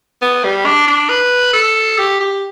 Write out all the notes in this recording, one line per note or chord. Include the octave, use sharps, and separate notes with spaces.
B3
G3
D4
D4
B4
A4
G4
G4